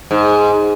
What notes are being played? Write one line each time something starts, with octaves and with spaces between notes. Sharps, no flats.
G#2